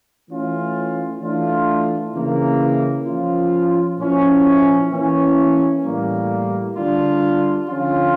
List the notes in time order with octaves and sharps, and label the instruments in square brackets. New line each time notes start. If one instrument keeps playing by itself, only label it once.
[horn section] E3 A3 C#4 F4
E3 A3 D4 F4
C#3 E3 A#3
F3 C#4 F4
A#2 F3 C#4 E4
E3 A#3 C#4
A2 E3 G3 A#3
D3 G3 D4 F4
D3 F3 C#4 F4